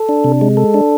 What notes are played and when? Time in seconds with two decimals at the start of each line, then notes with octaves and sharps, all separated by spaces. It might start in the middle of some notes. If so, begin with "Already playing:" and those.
Already playing: A4
0.09 D4
0.24 C3
0.41 G#3
0.57 A4
0.74 D4